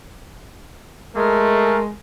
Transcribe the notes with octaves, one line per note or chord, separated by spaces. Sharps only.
G#3 A3 A#4